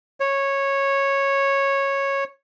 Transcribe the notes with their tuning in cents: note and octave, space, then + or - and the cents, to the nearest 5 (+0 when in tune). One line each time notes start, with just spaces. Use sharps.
C#5 -10